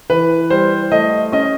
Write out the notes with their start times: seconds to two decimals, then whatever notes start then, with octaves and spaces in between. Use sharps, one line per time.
0.10 E3 B4
0.50 G3 C5
0.92 A3 D#5
1.32 C#4 D#5